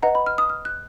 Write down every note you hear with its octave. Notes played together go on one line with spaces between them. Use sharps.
B4 D#5 F#5 A#5
B5
F6
D#6
F6
F#6